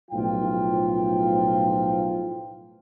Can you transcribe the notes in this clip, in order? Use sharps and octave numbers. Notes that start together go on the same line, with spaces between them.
B1 A2 F3 F4 G5